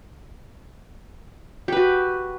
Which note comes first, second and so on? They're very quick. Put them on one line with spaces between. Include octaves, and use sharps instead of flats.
G4 B4 F#4